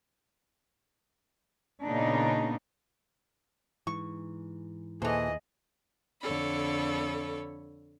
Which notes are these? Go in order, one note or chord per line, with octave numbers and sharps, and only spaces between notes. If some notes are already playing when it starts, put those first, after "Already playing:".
A#2 C#3 B3 D4 D#4
G#2 E3 C#6
D#2 A#2 E3 G#4 A4 C5 D#5
F2 D3 A4 C#5 B5